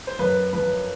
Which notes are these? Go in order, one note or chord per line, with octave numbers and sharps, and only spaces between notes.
C5
F#2 B4
F3 B4